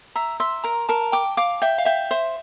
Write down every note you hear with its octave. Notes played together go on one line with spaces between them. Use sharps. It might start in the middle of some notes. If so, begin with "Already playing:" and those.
E5 A#5
E5 C6
A#4 A#5
A#4 A5
G5 D6
F5 D6
E5 G5
F5
E5 G5
C5 E5